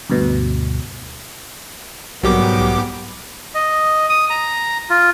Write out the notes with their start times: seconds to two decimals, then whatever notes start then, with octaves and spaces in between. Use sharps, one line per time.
0.10 D2 G2 B2
2.23 B1 G#2 F#3 G3 B3 G4 A#4 D6
3.55 D#5
4.09 D#6
4.30 A#5
4.90 F4